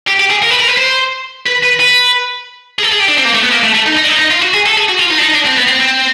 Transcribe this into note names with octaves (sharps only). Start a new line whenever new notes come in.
G4
G4
G#4
A#4
B4
A#4
B4
C5
B4
B4
B4
G#4
A4
G#4
G4
D4
C4
A#3
A3
B3
A#3
A3
A3
D#4
D#4
D4
D#4
D#4
F4
F#4
G#4
A4
G#4
F#4
F4
D#4
D4
D#4
D4
C4
B3
C4
C4